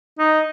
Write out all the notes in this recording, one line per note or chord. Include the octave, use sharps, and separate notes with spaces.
D#4